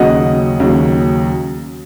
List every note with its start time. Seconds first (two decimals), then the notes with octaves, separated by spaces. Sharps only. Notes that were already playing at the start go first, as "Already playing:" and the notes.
Already playing: D#2 C#3 F#3 D#5 F#5
0.60 D#2 C#3 F#3